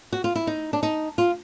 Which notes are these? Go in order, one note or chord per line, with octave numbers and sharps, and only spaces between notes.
F#4
F4
E4
D#4
D4
D#4
F4